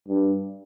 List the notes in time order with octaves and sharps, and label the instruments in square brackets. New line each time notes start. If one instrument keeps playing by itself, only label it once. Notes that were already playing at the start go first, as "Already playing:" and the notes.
[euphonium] G2